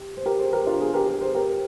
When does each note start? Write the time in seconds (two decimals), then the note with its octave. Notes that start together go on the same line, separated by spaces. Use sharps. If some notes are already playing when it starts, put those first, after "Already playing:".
Already playing: G4
0.17 C5
0.26 G4 A#4
0.39 G#4 C5
0.53 G4 A#4
0.66 D4 F4
0.80 F4 G#4
0.94 G4 A#4
1.08 G4 A#4
1.21 G#4 C5
1.35 G4 A#4